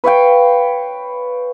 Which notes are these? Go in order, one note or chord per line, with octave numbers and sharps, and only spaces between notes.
B4 C#5 F5 G5